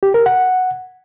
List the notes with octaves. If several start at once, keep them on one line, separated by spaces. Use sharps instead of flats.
G4
A#4
F#5